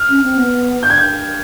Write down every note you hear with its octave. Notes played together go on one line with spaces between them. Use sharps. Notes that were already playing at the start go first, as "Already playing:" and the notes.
Already playing: F6
C#4
C4
B3
G6
G#6
G6